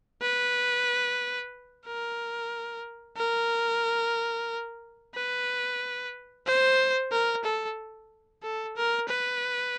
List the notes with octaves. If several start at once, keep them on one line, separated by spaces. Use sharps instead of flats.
B4
A#4
A#4
B4
C5
A#4
A4
A4
A#4
B4